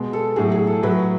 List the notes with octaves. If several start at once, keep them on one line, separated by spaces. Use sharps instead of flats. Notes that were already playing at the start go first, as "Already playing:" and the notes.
Already playing: B2 G#3
A4
A2 F#3 G#4
G#4
A4
A2 F#3 B4